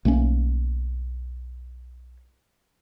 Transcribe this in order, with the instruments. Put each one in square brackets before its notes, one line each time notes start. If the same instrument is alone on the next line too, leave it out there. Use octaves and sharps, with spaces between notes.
[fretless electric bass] B1 A3 A#3 C#4